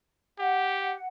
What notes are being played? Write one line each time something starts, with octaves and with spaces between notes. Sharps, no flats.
G4 F#5